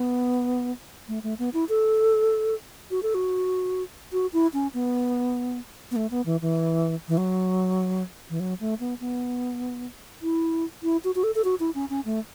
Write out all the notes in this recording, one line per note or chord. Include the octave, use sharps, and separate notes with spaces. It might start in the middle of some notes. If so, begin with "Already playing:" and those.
Already playing: B3
A3
A3
B3
E4
A4
F#4
A4
F#4
F#4
E4
C#4
B3
B3
A3
B3
E3
E3
E3
F#3
E3
F#3
A3
B3
B3
E4
E4
F#4
F#4
A4
A4
F#4
E4
C#4
C#4
A3